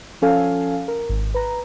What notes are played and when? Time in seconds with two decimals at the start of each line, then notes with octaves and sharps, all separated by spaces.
0.22 F3 C#4 A4 F5 G#5
0.88 A#4
1.09 G#1
1.34 B4 A#5